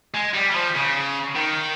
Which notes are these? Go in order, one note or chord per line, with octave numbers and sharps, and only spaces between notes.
G#3
G3
G3
F3
C#3
D#3